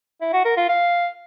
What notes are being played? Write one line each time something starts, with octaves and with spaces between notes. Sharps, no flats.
E4
F#4
A#4
F4
F5